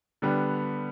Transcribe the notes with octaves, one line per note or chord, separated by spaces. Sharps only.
D3 G3 B3